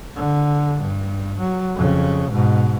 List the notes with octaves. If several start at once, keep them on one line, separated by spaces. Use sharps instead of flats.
D3
G2
F#3
F2 C#3
G#2 B2